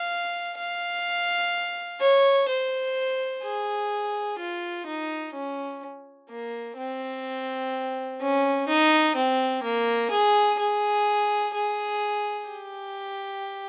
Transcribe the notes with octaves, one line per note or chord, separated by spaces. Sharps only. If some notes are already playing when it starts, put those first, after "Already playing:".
Already playing: F5
F5
C#5
C5
G#4
F4
D#4
C#4
A#3
C4
C#4
D#4
C4
A#3
G#4
G#4
G#4
G4